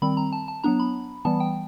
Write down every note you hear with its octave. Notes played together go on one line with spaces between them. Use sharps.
D#3 G3 C4 B5
A#5
A5
A5
F#3 B3 D4 A#5
B5
E3 G3 B3 A5
G5